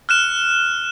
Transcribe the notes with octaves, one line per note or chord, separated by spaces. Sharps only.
F6 F#6 E7